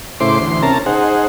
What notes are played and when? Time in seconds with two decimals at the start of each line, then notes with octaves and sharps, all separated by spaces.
0.20 A2 C#3 E4 C5 C6 D6
0.40 D2 E3 C6
0.62 C3 C#4 A#4 A5 A#5
0.86 D#4 G#4 C5 F#5